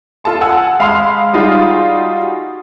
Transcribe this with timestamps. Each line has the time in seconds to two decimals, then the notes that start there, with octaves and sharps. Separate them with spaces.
0.24 F4 A4 A5 C6
0.41 F#5 G#5 A5 E6
0.79 G#3 F5 B5 C6 D#6 F7
1.33 G3 D#4 F4 F#4 G#4